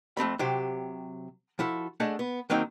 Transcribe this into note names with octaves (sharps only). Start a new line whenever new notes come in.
F2 A3 C4 B5
C3 F#3 G4 C5
F3 E4 F#4 A4
A3 D4 G#4 D#5 F#5
B3
D#3 F#3 A#3 C4 D#4